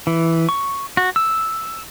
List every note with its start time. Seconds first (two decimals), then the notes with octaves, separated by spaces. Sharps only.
0.07 E3
0.49 C#6
0.97 F#4
1.16 E6